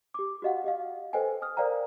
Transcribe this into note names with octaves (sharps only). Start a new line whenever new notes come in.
G4 D6
F#4 G4 D#5 F5 F#5
G4 D#5 F5
A4 B4 C5 D#5 G5 G#5
G#5 D#6 F6
A#4 C5 D5 F5 G5 A#5